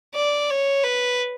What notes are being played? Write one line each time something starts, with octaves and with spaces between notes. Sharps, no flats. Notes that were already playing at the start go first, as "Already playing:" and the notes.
D5
C#5
B4